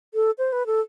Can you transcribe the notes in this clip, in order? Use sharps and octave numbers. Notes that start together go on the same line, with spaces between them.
A4
C5
B4
A4